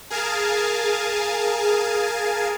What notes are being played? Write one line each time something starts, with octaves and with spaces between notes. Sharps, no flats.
G#4 A#4 F5 G#5 A5